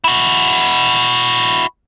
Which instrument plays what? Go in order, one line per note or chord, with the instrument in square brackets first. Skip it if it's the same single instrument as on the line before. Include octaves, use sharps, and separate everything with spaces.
[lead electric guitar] E4 F#4